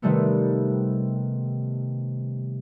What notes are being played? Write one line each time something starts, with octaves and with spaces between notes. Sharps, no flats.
C3 D#3 G3 A3 B3